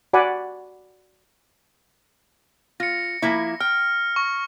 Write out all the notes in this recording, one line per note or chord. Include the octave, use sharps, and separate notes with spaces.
F#4 D5 F#5 G#5 B5
F4 A#6 C#7
F3 A#3 E4
G5 F6
C#6